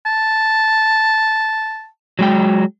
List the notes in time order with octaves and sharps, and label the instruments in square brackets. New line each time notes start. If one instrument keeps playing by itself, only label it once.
[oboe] A5
[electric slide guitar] F#3 G#3 G5